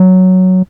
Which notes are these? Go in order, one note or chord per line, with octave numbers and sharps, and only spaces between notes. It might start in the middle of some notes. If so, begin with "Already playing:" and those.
Already playing: F#3